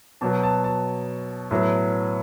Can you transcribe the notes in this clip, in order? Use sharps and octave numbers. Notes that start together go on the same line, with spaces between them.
B2 F#3 B3 A5
A5
A5
A2 F#3 B3